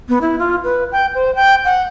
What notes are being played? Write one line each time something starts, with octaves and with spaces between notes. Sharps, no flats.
B3
E4
F4
B4
G5
C5
G5
F#5